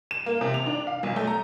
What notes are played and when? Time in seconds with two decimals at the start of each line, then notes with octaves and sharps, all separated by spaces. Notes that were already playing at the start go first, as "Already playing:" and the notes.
0.11 E7
0.26 A#3
0.41 C3
0.54 F7
0.66 D4
0.87 F5
1.03 B1
1.16 A3
1.27 A#5